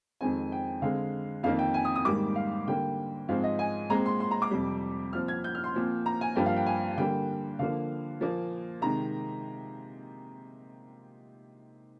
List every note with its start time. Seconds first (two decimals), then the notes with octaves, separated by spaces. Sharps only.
0.21 F2 D#3 G#3 C4 G#5
0.52 G5
0.82 D3 G#3 C4 F5
1.43 F2 D#3 A#3 F5
1.59 G5
1.74 G#5
1.85 D#6
1.96 D#6
2.05 G#2 D#3 G3 A#3 D6
2.36 F5
2.67 D3 G3 A#3 G5
3.29 G#2 F3 G#3 C4 F5
3.44 D#5
3.59 G#5
3.90 A#2 G#3 C4 A#5
4.06 C6
4.20 C6
4.31 A#5
4.42 D6
4.51 F2 C3 G3
5.13 A#2 F3 C4 F6
5.28 G#6
5.44 G6
5.55 F6
5.64 C6
5.75 A#2 F3 C4
6.06 A#5
6.21 G#5
6.36 G2 F3 A#3 G5
6.46 F5
6.56 G5
6.66 G#5
6.98 D3 G3 A#3 G5
7.59 D3 F3 A#3 F5
8.21 A#2 F3 A#3
8.82 C3 D#3 G#3 A#5